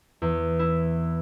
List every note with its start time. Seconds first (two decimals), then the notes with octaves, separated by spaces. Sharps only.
0.22 E2
0.59 E4